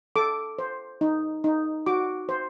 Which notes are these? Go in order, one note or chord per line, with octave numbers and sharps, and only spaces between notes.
A4 D6
C5
D#4
D#4
F#4 D6
C5